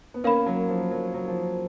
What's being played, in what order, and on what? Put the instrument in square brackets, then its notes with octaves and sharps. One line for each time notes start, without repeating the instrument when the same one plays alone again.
[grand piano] B3
[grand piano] A#3 C#4 [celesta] A#4 F5 B5
[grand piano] F#3
F3
F#3
F#3
F3